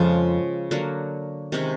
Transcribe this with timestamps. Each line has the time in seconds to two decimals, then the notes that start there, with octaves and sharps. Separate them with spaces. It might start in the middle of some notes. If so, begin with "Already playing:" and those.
Already playing: F2 C#3 F3 G#3
0.71 D3 F#3 A#3
1.52 C3 D#3 G#3 C#4